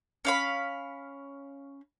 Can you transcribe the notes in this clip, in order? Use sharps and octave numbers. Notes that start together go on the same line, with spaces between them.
C#4 F5 B5